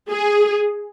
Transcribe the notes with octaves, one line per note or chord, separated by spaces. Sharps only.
G#4